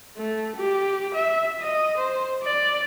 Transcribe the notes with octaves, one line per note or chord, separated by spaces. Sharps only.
A3
G4
E5
D#5
C5
D5